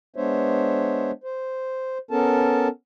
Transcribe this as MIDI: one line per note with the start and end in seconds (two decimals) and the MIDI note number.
0.16 1.11 56
0.16 1.11 59
0.16 1.11 62
0.16 1.11 72
0.16 1.11 73
0.16 1.11 76
1.24 1.98 72
2.11 2.68 59
2.11 2.68 61
2.11 2.68 69
2.11 2.68 70
2.11 2.68 81